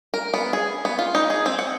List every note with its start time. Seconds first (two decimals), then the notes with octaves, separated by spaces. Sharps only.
0.14 A#4
0.34 B3
0.53 G#4
0.85 B3
0.99 F4
1.15 D#4
1.30 G#4
1.46 C4
1.59 F#5